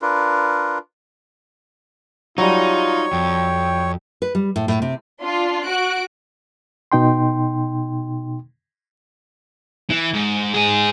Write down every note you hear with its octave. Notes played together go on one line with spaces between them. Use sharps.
D4 F4 A#4 B4
F#3 G3 D#4 F4 C#5
F2 G5
B4
G3
A2
A2
C3
D4 F4 C6
F#4 F#6 D7
B2 D#4 G5 C6
E3
G#2
G#2 G#4